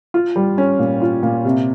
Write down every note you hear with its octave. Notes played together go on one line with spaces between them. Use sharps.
F4
G3
C#4
A#2
F4
A#2
C3